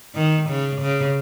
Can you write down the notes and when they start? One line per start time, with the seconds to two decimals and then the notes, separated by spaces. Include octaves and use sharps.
0.15 D#3
0.49 C#3
0.81 C#3